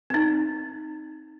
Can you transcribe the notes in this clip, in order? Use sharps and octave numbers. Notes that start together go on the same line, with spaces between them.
C4 D#4